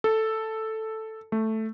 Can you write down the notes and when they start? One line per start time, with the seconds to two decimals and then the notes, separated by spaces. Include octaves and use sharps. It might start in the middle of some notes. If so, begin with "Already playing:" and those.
0.04 A4
1.32 A3